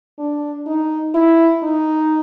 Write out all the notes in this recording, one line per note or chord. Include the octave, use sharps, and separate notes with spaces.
D4
D#4
E4
D#4